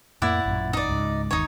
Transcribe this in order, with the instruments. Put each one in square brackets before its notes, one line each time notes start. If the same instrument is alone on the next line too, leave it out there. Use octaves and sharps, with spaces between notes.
[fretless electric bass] F2 A2 A#3 [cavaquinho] E4 D5 F#5
[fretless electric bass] A1 F#2 A#2
[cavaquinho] D#4 D5
[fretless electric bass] C#2 G#2
[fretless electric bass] G1 D#2 D#3 [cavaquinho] D#4 C#5